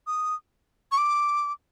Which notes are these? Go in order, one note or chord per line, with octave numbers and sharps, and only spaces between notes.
D#6
C#6
D6